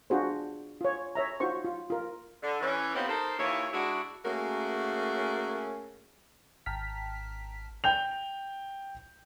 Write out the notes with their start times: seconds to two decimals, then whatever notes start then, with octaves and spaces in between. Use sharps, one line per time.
0.10 D4 F4 F#4 G#4 C5
0.81 F4 C#5
1.15 C#5 E5 A#5
1.40 D#4 F4 F#4 C5 C#6
1.65 F4
1.90 F4 A#4
2.42 D3
2.60 E3 C#4
2.94 B3 C4 D#4 F4 G4 B4
3.08 D#4 A4 A#4 C5
3.38 D#2 E3 E4 F4 C#5
3.72 G#3 D4 E4 F#4
4.25 A3 A#3 C#4 F#4 G#4 A#4
6.66 G#1 G5 A5 A#5 F6 B6
7.84 G5 G6 F7